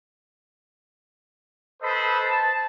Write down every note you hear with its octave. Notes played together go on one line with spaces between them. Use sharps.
A4 B4 C5 D#5 A5 B5
A5